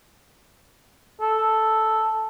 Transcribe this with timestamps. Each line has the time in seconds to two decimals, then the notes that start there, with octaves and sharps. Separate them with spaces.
1.21 A4